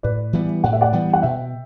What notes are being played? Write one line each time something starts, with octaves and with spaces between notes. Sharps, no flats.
A2 B4 D5
E3 G3 B3
A2 F#5
E5
D5 F#5
E3 G3 B3
F#5
B2 E5 G5